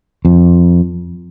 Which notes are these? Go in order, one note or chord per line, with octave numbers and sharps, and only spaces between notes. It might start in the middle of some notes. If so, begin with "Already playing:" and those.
F2